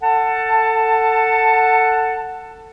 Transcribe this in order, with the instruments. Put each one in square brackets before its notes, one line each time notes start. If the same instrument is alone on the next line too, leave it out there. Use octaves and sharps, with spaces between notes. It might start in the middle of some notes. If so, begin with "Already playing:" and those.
[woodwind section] A4 F#5 A5